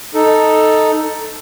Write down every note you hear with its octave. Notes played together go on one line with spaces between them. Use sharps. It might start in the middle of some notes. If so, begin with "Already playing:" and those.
D#4 A4